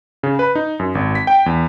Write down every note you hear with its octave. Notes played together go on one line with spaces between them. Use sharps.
C#3
B4
D#4
F#2
G#1
B6
G5
E2